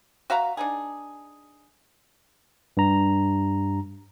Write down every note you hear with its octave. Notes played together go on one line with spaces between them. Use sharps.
F#4 E5 F5 A#5
D4 D#4 G#4
G2 A#5